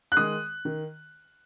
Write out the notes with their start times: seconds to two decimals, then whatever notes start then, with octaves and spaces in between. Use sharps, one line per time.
0.12 F#6
0.17 D#3 G#3 D#6
0.65 D#3